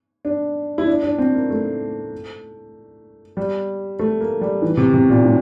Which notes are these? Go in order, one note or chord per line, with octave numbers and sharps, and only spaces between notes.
D4
E4
D4
D4
C4
A#3
A3
G3
A3
A#3
G3
E3
C3
C3
A#2
A2